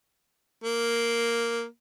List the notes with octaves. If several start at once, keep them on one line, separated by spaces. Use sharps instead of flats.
A#3